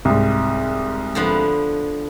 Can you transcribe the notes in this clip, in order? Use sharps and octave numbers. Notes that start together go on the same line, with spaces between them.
C2 G#2
D3 F3 B3